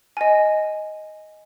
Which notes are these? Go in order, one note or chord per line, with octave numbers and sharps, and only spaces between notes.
D#5 G#5